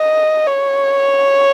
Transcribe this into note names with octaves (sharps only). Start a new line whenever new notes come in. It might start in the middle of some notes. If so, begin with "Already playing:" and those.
Already playing: D#5
C#5